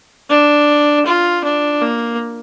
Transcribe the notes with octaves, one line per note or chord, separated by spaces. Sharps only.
D4
F4
D4
A#3